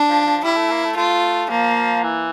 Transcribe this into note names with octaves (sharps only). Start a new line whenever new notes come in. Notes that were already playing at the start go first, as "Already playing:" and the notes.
Already playing: D4
F3
F3
G3 E4
A3
A#3
A3
A3 F4
F3 A#3
E3